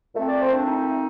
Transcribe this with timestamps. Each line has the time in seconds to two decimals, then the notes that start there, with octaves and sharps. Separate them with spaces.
0.14 A#2 A3 C4
0.27 D5
0.40 C5
0.53 D4
0.67 D#4